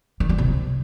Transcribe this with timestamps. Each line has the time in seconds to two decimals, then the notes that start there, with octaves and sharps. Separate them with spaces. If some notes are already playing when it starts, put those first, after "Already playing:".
0.20 D#3
0.29 G3
0.38 C3